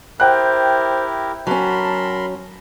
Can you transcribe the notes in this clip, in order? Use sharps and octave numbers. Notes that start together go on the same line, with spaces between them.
E4 G4 A#4 C5 G5 F#6
F#3 C#4 A#4 A5 B5 C6